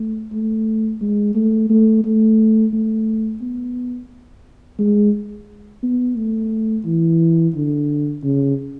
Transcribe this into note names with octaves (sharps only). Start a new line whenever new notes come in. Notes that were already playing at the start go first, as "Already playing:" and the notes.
Already playing: A3
A3
G#3
A3
A3
A3
A3
B3
G#3
B3
A3
E3
D3
C#3